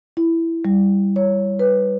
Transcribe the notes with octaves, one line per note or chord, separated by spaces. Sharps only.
E4
G3
C#5
B4